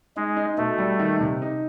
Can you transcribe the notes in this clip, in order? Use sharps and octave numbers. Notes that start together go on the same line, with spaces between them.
G#3 D#4
D#4
B2 A3
G3
D#3
C3
D#4